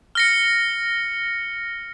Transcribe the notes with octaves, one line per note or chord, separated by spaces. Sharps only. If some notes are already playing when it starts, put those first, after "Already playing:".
F6 A#6 C#7